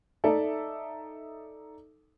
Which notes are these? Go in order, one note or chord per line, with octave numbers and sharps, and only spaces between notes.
D#4 A4 D5 E5